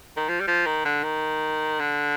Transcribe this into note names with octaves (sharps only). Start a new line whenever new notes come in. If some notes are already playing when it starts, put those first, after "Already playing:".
D#3
F3
G3
F3
D#3
D3
D#3
D3